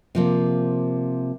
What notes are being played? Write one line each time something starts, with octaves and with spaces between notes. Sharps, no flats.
C3 F3 A#3